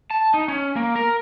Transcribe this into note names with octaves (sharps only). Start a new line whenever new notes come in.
A5
D#4
C#4
A#3
A#4